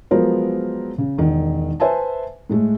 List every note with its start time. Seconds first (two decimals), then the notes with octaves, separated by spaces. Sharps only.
0.11 F3 F#3 G#3 B3 A#4 C5
0.98 C#3
1.18 E1 D#3
1.80 B4 C5 E5 G#5 A5
2.50 A2 G#3 A3